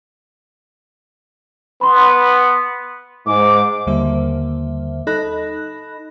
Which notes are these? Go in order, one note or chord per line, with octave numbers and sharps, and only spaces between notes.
B3 B5 C6
G#2 D6
D#2 D3 G3 A#3 C5 E5
D#4 A4 D#5 B5 F#6 A#6